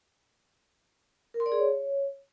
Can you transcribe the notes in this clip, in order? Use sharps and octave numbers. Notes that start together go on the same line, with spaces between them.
A#4
C6
D5
G#4
C#5